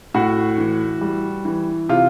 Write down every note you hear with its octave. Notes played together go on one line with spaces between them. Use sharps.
A2 F#4
E3
G3
E3
C3 F4